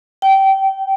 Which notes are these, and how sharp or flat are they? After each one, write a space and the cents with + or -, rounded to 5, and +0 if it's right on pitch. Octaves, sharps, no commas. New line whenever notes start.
G5 -20